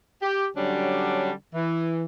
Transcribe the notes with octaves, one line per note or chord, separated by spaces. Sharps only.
G4
D3 F#3 G3 C#4 D4
E3